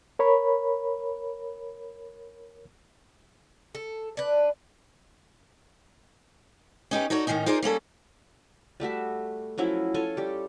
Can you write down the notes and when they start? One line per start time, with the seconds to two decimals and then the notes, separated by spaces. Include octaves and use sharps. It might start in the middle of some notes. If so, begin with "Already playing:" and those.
0.19 A#4 C#5 B5
3.75 A4
4.17 D4 B4
6.91 C#4 D#4 G4 B4
7.10 D#4 F#4 A4 C#5 D5
7.27 A2 D#3 E3 C#4 D#4
7.46 D#4 F4 G#4 A#4 C5 D5
7.62 G3 A#3 C#4 A4
8.80 G3 A3 F#4 E5
9.58 F3 F#3 C#4 E4
9.94 F4 A4 C#5 G#5
10.17 G3 G4